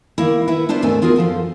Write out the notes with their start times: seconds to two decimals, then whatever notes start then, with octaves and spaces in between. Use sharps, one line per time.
0.18 D#3 A#3 E4
0.48 E4 B4 E5 F#5
0.69 B3 D4 F4 C5 E5
0.82 D#2 G#2 A3 C4 G#5
1.02 B3 F4 F#4 G#4 A#4
1.16 F#2 F3 A4 C5